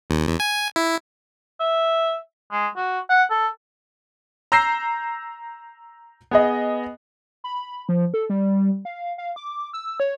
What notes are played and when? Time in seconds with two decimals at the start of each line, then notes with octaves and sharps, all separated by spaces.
0.10 D#2
0.28 E2
0.40 G#5
0.76 E4
1.60 E5
2.52 G#3
2.76 F#4
3.10 F#5
3.30 A4
4.52 A#5 E6 G6 A#6 C7 E7
6.31 B3 G#4 D#5
7.44 B5
7.89 F3
8.14 A4
8.30 G3
8.85 F5
9.18 F5
9.36 D6
9.73 E6
10.00 C#5